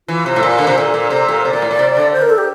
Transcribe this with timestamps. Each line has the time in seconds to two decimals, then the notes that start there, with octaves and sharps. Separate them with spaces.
0.08 E3 F4
0.26 C3
0.36 A2
0.43 A#2
0.58 D3
0.67 C3
0.77 A#2 A4
0.94 A#2
1.10 C3
1.28 A#2
1.45 C3 D5
1.53 A#2
1.62 A2
1.71 A#2
1.79 C3
1.97 D3
2.13 C5
2.22 A#4
2.30 A4
2.38 G4